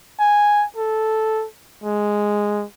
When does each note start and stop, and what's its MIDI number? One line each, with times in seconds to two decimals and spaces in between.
0.20 0.66 80
0.76 1.46 69
1.84 2.64 56